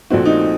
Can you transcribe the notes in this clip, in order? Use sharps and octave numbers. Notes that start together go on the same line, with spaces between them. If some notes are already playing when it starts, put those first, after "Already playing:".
A#1 A#2 A3 C4 F#4
D#4